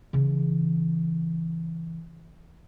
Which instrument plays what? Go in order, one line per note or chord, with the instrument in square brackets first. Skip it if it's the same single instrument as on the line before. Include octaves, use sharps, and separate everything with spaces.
[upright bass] C#3 E3